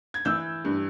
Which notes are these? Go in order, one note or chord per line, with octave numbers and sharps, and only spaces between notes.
G#6
E3 E6 G6
G2